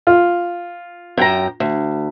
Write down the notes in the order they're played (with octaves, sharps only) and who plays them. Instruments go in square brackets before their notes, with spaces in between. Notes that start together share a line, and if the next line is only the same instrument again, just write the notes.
[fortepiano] F4
[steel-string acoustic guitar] F#2 G5 A#5
D2